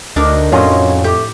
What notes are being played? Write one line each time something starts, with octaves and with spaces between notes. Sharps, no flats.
D2 D4 D#4 A#4
F2 A2 F#3 C#4 F4 D#5
A3 G4